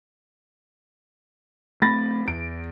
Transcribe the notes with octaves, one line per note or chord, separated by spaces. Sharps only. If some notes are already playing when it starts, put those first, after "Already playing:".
A3 C4 B5 A6 A#6
E2 D7